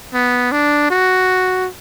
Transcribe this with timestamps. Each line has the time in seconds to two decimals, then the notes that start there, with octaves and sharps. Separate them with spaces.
0.14 B3
0.52 D4
0.90 F#4